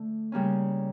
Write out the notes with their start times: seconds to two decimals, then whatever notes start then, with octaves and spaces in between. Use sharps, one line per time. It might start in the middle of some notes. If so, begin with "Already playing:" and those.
Already playing: D3 A3 D4
0.32 C#3 G3 A#3 C#4